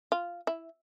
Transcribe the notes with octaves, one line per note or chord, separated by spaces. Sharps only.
F4
E4